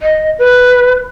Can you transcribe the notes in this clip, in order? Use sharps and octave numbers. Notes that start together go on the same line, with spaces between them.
D#5
B4